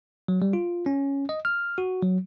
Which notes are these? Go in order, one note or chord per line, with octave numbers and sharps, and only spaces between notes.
F#3
G3
F4
C#4
D#5
F6
F#4
F#3